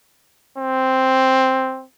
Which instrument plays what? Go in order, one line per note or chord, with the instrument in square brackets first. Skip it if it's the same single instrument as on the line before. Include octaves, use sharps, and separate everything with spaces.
[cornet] C4